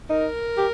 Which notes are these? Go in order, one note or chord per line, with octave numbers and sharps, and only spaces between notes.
D#4 A#4
G4